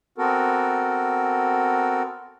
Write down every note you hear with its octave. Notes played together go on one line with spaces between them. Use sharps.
B3 C4 F#4 A4 A#4